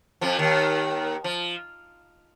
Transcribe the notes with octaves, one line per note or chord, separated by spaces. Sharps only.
F2 F3
D#2 D#3
F3